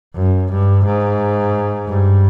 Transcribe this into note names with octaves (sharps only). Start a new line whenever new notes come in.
F#2
G2
G#2
G2